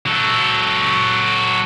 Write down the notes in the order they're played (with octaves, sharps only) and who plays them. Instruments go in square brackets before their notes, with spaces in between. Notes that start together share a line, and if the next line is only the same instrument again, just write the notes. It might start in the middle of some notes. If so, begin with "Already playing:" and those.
[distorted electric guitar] F#3 A4